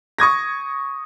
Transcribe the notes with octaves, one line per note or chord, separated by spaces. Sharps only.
C#6 D#6 G#6 A#6